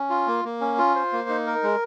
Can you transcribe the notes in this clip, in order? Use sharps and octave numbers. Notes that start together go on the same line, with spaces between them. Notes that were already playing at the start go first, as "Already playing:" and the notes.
Already playing: C#4
F4
A#3
A#3
C#4
F4
C5
A#3
D#4
A#4
G#3